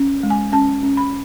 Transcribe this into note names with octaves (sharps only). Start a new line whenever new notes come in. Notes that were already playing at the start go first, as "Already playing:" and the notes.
Already playing: C#4
G#3
G#5
C#4 A5
C#4
B5